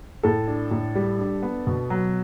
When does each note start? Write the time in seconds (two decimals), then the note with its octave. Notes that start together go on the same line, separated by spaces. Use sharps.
0.23 A2 A4
0.48 D4
0.71 A2
0.95 G3
1.19 D4
1.43 B3
1.67 B2
1.90 F#3